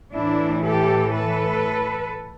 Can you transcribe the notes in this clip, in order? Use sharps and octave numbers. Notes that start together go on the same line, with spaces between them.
A2 E3 D4 E4
G4 A4
A4 B4